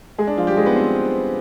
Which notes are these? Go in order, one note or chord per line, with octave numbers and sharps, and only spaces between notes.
G#3 G#4
D4
F3 F4
G3 G4
G#3 G#4
B3 B4
C4 C5